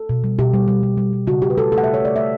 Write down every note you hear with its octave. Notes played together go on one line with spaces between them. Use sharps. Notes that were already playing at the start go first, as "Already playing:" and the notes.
Already playing: A4
B2
G3
B2 G4
G3
G3
G3
G3
G3
C#3 F#4
C#3 G4
B4
C#3 A4
A3 A4
F#5
C#3 E5
C#5
A3 D5
A3 E5